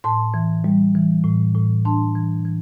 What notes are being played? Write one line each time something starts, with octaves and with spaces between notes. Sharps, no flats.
A2 A5 C6
E3
G3
E3
A2
A2
D4 A5 C6
E3
E3